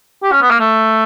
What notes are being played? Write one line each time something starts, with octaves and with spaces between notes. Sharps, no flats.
G4
C#4
B3
A#3
A3